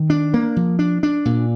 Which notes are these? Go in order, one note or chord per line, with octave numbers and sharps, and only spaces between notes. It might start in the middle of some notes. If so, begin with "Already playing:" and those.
Already playing: D#3
D4
A#3
F3
D4
D4
A#2